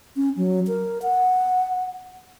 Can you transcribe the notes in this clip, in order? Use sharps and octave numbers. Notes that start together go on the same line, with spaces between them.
C#4
F#3
A#4
F#5